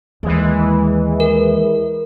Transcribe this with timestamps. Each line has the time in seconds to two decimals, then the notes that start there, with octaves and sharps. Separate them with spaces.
0.23 D#2 E3 G#3
1.20 A#4